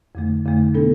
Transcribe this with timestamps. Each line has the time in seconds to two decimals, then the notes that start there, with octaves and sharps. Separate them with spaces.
0.15 F2 D3 A3
0.45 F2 D3 A3
0.74 B2 B3 D4 A4